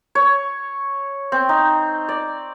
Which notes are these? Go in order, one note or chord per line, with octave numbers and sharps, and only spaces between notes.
C#5
C4
D#4
D5